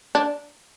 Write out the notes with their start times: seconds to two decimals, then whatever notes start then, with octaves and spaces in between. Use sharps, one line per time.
0.15 D4